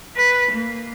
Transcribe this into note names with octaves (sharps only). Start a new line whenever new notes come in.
B4
A#3